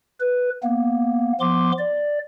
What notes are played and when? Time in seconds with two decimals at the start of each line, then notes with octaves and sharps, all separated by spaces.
0.20 B4
0.63 A#3 B3
1.40 F3 B3 C6 D6
1.79 D5